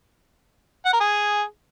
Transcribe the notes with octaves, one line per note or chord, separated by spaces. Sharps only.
F#5
A#4
G#4